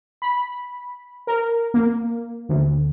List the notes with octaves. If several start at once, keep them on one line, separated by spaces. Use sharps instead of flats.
B5
A#4
A#3
D2